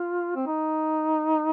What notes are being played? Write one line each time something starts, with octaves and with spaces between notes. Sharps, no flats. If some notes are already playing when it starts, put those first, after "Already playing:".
Already playing: F4
C4
D#4